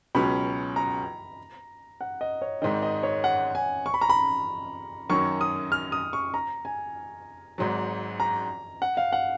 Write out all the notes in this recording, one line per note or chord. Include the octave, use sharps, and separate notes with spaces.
C#2 B2 F#3 C#4 B5
A#5
F#5
D#5
C#5
G#1 G#2 D#3 D#5
D#5
C#5
F#5
G#5
C#6
B5
A#5
B5
F#2 D#3 F#3 C#4 C#6
D#6
F6
D#6
C#6
A#5
G#5
G#1 G#2 F#3
A#5
F#5
F5
F#5